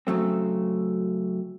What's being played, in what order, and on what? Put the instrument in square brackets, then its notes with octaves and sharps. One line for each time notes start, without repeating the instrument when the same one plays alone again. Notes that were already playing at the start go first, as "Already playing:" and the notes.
[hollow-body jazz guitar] C#3 F#3 A3 C4